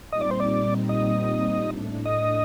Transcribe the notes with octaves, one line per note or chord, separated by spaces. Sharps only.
A#2 G3 C4 D#4 D#5
D5
C5
D5
D#5
A2 A3 D4
D#5